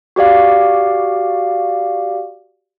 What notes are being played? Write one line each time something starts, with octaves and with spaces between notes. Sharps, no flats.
F#4 G4 D5 F5